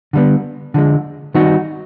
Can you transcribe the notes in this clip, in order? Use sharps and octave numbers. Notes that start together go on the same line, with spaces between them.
D3 G3 B3
D3 F3 G#3
D#3 G3 C4 D#4 F#4